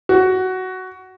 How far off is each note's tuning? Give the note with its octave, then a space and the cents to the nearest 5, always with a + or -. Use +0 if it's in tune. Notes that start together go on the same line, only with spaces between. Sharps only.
F#4 +10